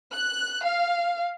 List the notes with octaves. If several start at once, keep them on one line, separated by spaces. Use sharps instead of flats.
F#6
F5